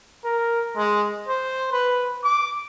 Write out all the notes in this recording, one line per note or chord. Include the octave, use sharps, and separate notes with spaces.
A#4
G#3
C5
B4
D6